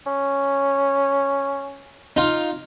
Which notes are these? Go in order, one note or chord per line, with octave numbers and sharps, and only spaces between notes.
C#4
D#4 F4